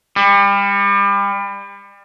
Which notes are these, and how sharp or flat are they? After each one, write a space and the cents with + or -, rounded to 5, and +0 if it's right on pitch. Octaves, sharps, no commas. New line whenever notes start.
G3 +30